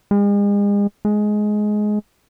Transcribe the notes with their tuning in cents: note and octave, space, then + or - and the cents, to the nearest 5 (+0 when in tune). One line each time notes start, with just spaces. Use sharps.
G#3 -40
G#3 +15